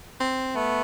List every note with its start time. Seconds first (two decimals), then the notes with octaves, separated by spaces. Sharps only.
0.20 C4
0.56 A3 B3